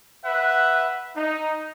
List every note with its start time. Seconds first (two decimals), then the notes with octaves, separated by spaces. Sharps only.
0.24 B4 E5 F#5
1.16 D#4